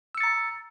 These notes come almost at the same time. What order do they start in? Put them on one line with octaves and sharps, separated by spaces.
E6 C#7 A6 A#5